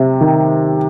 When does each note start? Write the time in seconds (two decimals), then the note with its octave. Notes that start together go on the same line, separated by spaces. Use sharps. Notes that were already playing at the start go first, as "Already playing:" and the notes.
Already playing: C3
0.21 D#3